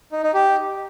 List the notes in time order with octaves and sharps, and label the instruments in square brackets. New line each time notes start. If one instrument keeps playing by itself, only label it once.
[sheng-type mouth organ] D#4
D#4
G4